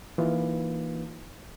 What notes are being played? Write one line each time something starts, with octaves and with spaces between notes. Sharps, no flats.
E3 A#3 D#4 F4 B4